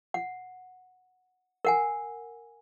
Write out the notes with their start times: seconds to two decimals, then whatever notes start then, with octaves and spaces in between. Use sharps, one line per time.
0.14 F#5
1.65 A#4 F#5 G#5